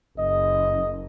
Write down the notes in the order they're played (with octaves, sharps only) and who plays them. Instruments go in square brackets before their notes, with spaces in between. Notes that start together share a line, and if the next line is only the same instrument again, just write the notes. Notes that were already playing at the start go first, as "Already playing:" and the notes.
[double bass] F#1 [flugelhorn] D#5